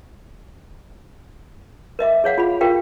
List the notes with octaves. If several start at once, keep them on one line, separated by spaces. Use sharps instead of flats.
A#4 D#5 E5 D6
G#4 C#5 F5 F#5
F4 G#4 B5
F4 G4 A#4 F5 G5